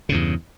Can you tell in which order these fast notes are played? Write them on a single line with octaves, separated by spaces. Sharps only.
C#3 G2 E2